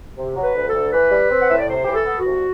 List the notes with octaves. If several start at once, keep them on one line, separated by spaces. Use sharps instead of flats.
C3
F#3
B4
D2
A4
D2
E3 B4
G3
C4
F#5
A2 E5
D5
C3 C5
E3 G4
A4
B3
F#4
C2